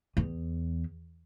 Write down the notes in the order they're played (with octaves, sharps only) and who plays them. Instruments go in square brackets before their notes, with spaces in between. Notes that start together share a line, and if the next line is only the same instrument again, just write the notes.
[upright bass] E2